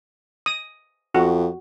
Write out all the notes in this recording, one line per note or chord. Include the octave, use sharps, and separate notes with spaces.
D#6
F2 F#4